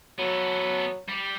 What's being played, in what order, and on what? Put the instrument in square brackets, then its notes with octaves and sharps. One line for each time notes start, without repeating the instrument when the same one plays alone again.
[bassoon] F#3 [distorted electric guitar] B3 A4
[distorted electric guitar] G3